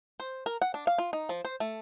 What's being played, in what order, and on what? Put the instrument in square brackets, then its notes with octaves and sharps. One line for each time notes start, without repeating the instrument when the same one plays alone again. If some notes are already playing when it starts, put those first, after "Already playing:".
[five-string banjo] C5
A#4
F#5
D4
F5
F4
D#4
F3
C5
A3